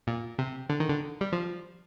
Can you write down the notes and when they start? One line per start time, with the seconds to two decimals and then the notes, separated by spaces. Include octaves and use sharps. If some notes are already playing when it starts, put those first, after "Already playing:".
0.07 A#2
0.39 C3
0.70 D3
0.80 D#3
0.89 D3
1.21 G3
1.32 F3